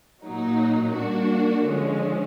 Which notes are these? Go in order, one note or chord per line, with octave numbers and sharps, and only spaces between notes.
A#2 F#3 A#3 D#4
G3 A#3 D4 F#4
D3 F3 G#3 C#4